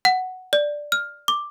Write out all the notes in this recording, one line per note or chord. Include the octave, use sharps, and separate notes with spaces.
F#5
D5
F6
D6